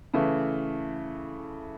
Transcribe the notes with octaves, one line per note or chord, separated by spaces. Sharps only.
C#3 E3 A3